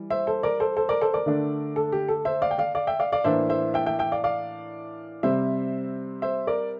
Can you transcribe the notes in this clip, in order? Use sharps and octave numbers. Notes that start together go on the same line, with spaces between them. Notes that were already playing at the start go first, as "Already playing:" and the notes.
Already playing: E3 G3
C5 E5
A4 C5
A#4 D5
A4 C5
A4 C5
A#4 D5
A4 C5
A#4 D5
D3 A3 D4
A4
G4
A4
C5 E5
D5 F5
G5
D5 F5
D5 F5
E5 G5
D5 F5
D5 F5
A2 E3 A#3 D4 C5 E5
C5 E5
E5 G5
E5 G5
E5 G5
D5 F5
D5 F5
C3 G3 C4 C5 E5
C5 E5
A#4 D5